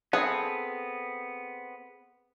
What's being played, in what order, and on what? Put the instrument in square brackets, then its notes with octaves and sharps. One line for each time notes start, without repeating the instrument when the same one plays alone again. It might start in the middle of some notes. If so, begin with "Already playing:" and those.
[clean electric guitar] B3 C4 [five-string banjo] G#4 A4 B4